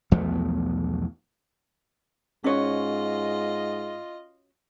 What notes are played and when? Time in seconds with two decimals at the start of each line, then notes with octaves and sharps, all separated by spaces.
0.11 B1 E2 F3 A3
2.44 G#2 C#4 F4 F#4 C#5 D#5